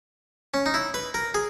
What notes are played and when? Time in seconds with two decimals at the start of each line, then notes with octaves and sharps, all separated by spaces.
0.54 C#4
0.66 D#4
0.74 E4
0.94 B4
1.14 A#4
1.34 G#4